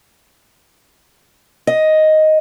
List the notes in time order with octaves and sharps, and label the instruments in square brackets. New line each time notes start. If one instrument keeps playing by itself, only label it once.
[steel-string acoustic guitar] D#5